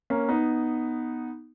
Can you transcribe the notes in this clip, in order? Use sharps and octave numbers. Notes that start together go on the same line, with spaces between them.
A#3 C#4
B3 D#4